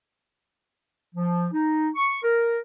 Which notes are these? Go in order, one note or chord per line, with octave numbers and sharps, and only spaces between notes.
F3
D#4
C#6
A#4